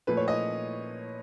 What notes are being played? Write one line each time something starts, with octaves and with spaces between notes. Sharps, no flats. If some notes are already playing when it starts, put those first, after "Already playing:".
A#2 F3 A3 B4
C#5
D#5